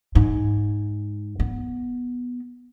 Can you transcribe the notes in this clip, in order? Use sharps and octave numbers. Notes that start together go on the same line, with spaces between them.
G#2
B3